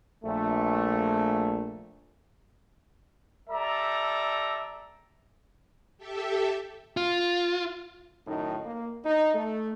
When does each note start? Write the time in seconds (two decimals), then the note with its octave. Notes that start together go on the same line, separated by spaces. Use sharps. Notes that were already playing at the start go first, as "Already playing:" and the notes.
0.24 A#1 A3
3.50 G3 A4 D5 E5 A#5
5.98 G4 A4 E5
6.97 F4
8.27 F#2 A2 D#3 D#4
8.65 A#3
9.04 D#4
9.34 A3